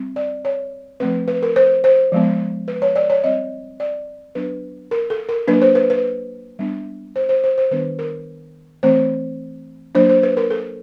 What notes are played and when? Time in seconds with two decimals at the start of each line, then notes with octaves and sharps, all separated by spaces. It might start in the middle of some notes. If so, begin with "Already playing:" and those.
Already playing: G3 C4
0.16 D5
0.45 C#5
1.00 F3 A3 C4 B4
1.28 B4
1.43 A#4
1.56 C5
1.84 C5
2.12 F3 G#3 B3
2.68 B4
2.82 C#5
2.96 D5
3.10 C#5
3.24 G3 C4 D#5
3.80 D5
4.35 F#3 B3 D4 B4
4.91 A#4
5.10 A4
5.29 A#4
5.48 F#3 A#3 D4 B4
5.62 C5
5.75 B4
5.90 B4
6.59 G3 B3 D4
7.16 C5
7.29 C5
7.44 C5
7.58 C5
7.71 D#3 G3 B3 D4 B4
7.99 A#4
8.83 E3 A3 C4 C5
9.95 F#3 A#3 D4 C5
10.09 C5
10.23 B4
10.37 A#4
10.51 A4